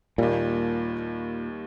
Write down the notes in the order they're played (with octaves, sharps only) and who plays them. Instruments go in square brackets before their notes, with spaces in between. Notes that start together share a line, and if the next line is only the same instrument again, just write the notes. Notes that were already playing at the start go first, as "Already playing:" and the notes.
[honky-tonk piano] D#2 D#3 G3 [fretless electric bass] A#2